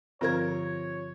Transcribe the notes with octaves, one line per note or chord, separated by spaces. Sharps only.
G2 D3 F3 C4 F4 A#4 C#5 G#6